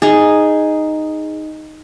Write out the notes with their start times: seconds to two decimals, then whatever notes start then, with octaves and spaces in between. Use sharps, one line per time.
0.02 D#4 G#4